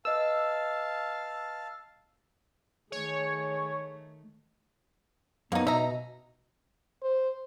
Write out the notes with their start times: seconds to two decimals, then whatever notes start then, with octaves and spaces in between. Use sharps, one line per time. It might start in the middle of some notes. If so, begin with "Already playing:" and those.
0.05 B4 D#5 F5 A5 E6
2.92 D#3 A3 G#4 C#5
5.52 F#2 A#3 B3 D#4
5.67 B2 D#4 E5 A#5
7.02 C5